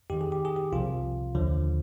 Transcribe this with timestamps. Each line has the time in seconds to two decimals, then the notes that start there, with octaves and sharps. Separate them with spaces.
0.10 F2 D#3 G4
0.21 G#4
0.32 G4
0.45 G#4
0.56 G4
0.72 C2 C3 F3 F4
1.35 D#2 D3 F3